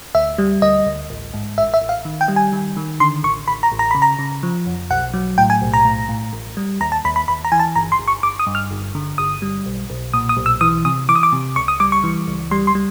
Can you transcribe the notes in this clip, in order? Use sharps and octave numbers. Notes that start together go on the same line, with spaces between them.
D2 E5
G3
D2 D#5
D2
A1
G#2
A1 E5
E5
A1
F5
D#3
G5
G3
G#5
D#3
D#3
D3 C6
A1 C#6
A1 B5
A#5
A1
A#5
C#3 B5
A#5
C#3
F3
F2
B1 F#5
F#3
A2 G5
G#5
B1
A#5
A2
A2
A1
G3
D#2 A#5
A5
D#2 B5
B5
D#2 B5
A#5
E3 G#5
A5
G1 A#5
C6
G1
C#6
G1 D6
D#6
G2
F6
G1
D3
G1 D#6
G3
B1
B1
A#2 D#6
D#6
B1
E6
E3 D#6
C3 D#6
E3 D6
D#6
D6
C3
C#2 C#6
D#6
G3 D6
C#6
E3
C#2
G3 C6
C6
G3